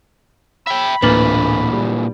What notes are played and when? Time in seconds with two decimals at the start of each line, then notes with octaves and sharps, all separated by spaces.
0.67 E5 G5 B5
1.02 D1 A#2 E3 A#3 D4 B4 F#7
1.73 G3